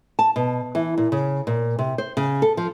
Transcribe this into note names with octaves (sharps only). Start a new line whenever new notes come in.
A5
B2
E3
A#2
C#3
A#2
C3
C5
C#3
A4
F3